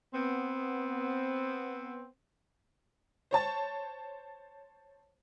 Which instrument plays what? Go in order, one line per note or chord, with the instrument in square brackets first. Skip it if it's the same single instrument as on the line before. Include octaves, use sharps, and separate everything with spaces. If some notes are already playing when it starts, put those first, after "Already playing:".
[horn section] B3 C4
[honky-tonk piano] C5 C#5 A5 A6